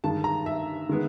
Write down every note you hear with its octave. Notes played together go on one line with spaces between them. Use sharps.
G2 D#3 G#3 A5
A#5
E5
D#3 G#3 B3